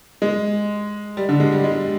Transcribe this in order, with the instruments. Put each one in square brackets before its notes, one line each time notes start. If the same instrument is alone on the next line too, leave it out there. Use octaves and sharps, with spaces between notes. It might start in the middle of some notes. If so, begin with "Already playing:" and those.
[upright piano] G#3
G3
D3
G#3
G3
G#3